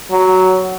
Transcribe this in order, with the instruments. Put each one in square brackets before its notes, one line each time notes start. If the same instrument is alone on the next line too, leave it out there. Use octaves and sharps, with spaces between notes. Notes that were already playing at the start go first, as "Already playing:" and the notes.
[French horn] F#3